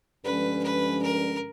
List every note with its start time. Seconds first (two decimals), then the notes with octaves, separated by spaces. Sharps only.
0.24 G2 D3 F3 G#3 C#4 B4
0.63 B4
1.02 A#4